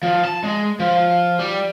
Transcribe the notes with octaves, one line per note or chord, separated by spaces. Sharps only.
F3
A5
G#3
F3
G3